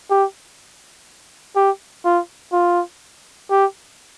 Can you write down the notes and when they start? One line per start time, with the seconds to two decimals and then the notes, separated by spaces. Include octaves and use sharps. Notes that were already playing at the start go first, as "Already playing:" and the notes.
0.11 G4
1.56 G4
2.05 F4
2.53 F4
3.51 G4